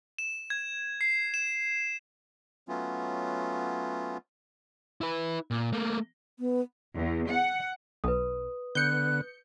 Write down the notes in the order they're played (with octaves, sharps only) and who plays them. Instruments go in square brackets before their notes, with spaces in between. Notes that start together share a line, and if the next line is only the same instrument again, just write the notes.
[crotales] E7
G#6
C7
E7
[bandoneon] F#3 A3 B3 C#4 F4
[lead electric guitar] E4 B4
A#2
A3 A#3
[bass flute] B3
[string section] E2
F#5
[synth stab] B1 [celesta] B4 D#6
[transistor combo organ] D3 B3 [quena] F#6 [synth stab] G6 C#7